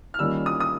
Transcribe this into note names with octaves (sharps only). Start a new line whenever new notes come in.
F6
D#3 G3 A#3 C#4 F4 E6
D#6
D#6